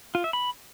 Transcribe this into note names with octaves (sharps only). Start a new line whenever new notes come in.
F4
E5
B5